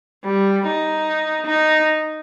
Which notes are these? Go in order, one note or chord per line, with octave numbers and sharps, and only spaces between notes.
G3
D#4
D#4